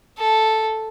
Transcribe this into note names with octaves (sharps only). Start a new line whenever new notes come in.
A4